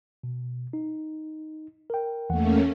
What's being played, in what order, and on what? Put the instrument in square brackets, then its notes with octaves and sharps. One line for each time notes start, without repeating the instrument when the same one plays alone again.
[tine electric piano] B2
D#4
A#4 G5
[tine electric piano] E2 E3 F#5 [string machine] A3 A#3 C#4